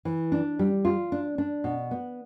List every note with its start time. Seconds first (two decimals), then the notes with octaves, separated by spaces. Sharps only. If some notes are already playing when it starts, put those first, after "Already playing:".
0.05 E3
0.32 D4
0.59 G3
0.85 F4
1.12 D4
1.38 D4
1.64 B2
1.91 B3